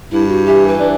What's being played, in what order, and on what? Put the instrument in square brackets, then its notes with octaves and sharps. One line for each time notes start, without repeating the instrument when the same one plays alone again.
[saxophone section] G2 [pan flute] E4
[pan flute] F#4
[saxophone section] E3 [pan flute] G4
[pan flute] B4
[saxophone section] D4